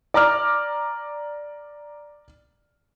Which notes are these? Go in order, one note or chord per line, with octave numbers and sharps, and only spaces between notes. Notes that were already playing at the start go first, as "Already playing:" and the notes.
D5 A#5 D6 F6